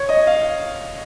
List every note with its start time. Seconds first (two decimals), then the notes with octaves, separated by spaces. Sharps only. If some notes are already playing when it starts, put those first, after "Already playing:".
Already playing: C#5
0.09 D#5
0.27 F5